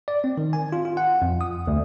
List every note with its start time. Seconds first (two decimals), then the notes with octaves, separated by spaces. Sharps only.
0.08 D5
0.24 C4
0.38 D#3
0.53 G#5
0.72 F4
0.85 F4
0.97 F#5
1.22 F2
1.41 D#6
1.67 D2